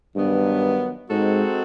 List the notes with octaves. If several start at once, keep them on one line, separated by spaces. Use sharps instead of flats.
G2 D#3 F#3 B3
G#2 G#3 C4 D#4 F#4 A4